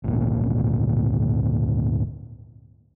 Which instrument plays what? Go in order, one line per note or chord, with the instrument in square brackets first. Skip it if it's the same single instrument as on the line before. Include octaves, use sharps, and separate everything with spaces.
[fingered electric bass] G#1 D2 A#2